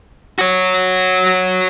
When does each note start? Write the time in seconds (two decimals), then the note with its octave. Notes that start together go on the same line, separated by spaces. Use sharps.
0.39 F#4 C#5